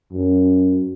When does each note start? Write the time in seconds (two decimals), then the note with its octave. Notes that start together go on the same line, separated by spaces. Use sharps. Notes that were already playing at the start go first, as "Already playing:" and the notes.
0.13 F#2